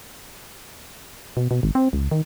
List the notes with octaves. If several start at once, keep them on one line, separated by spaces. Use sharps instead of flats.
B2
B2
G#1
C4
C#2
D#3